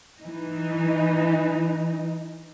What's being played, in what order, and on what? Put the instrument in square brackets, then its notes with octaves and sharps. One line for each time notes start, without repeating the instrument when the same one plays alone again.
[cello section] E3 D#4